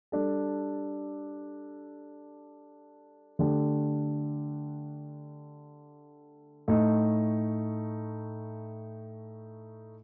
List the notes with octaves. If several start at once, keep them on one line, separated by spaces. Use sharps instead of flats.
G3 D4 A4
D3 A3 D4 G4
A2 A3 D#4